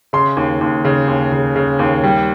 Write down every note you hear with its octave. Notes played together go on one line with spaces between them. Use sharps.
C#3 C6
D#2
D#2
C#3
D#2
C#3
C#3
D#2
G3